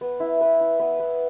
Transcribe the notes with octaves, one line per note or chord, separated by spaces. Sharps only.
B3
E4
B4
E4
B3
B3